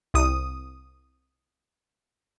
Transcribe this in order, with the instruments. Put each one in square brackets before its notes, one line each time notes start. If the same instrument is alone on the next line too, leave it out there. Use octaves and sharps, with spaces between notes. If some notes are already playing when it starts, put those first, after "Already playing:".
[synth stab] C2 D#6